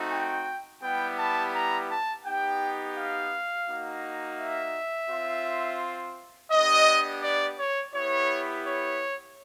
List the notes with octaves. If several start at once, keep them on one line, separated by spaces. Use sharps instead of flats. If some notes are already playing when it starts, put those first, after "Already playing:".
Already playing: A3 C4 D#4 F#4
G5
G3 B3 E4 G4 G5
A5
A#5
A5
B3 D#4 G4 G5
F5
A#3 D#4 F#4
E5
C4 F4
B3 D4 G4 D#5
D5
C#5
B3 E4 G4 C#5
C#5